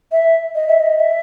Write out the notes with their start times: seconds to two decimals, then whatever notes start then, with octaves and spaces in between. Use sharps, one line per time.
0.12 E5
0.55 D#5
0.68 E5
0.80 D#5
1.00 E5